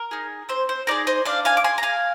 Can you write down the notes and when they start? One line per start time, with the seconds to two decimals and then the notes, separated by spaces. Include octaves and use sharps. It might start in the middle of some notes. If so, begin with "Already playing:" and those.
Already playing: A#4
0.11 D#4 G#4
0.49 C4 C5
0.69 C5
0.87 D#4 G#4 A#4 D5
1.07 C5 D#5
1.25 D4 D5 F5
1.45 F5 G#5
1.57 D6
1.64 G#4 G#5 C6
1.78 A#5
1.83 F5 G#5